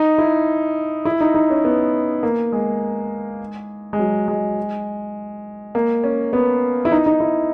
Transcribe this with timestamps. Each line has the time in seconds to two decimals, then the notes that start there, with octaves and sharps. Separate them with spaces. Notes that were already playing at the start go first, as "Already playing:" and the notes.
Already playing: D#4
0.18 E4
1.05 E4
1.21 D#4
1.34 D#4
1.50 C#4
1.65 B3
2.23 A#3
2.52 G#3
3.93 G#3
3.99 F#3
4.28 G#3
5.75 A#3
6.04 C#4
6.33 B3
6.85 E4
6.92 D#4
7.06 D#4
7.20 E4